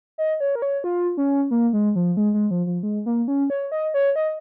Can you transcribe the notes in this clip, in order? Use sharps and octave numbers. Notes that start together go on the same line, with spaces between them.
D#5
C#5
A#4
C#5
F4
C#4
A#3
G#3
F3
G#3
G#3
F3
F3
G#3
A#3
C#4
C#5
D#5
C#5
D#5